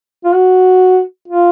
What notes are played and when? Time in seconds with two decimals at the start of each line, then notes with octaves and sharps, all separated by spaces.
0.24 F4
0.34 F#4
1.28 F4